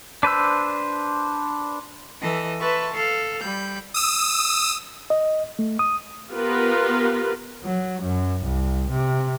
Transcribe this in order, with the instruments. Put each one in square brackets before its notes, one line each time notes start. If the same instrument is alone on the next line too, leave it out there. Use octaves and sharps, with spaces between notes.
[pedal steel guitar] D4 B4 C5 E6
[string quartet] E3 A4 D#5
B4 E5 A5 C6 C#6
A4 F5
G3 B5 G6
[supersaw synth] D#6 E6
[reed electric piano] D#5
A3
D#6
[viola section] B3 F4 G4 A#4 B4
[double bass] F#3
F#2
C2
C3